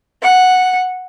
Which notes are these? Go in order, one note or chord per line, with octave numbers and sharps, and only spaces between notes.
F#5